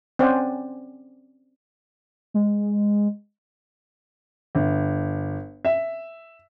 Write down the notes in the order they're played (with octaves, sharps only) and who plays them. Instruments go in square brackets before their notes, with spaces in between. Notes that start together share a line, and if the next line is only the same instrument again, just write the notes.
[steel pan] C4 C#4 C5 D5 F#5 G#5
[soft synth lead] G#3
[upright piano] G1
E5